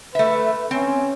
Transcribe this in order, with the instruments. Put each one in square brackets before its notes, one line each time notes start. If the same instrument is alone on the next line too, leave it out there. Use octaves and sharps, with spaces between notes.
[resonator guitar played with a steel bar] A3 E5 [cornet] B4
[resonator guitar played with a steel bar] C4 [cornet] C#4